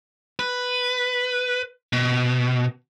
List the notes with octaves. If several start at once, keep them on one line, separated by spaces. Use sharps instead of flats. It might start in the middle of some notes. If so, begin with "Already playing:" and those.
B4
B2